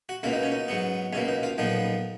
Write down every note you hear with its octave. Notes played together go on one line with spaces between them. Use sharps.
F#4
C#2 B2 A#3 F4
D#4
C#4
D#4
G#2 F#3 B3
C#2 B2 A#3 C#4
D#4
F4
B1 A#2 F3 B3 D#4